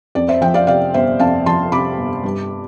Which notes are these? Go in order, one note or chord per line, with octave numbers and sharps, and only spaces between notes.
F2 D5
C5 E5
F3 E5 G5
D5 F5
C3 D5 F5
G1 C5 E5
F2 F5 A5
F3 A5 C6
C3 B5 D6
G1
G2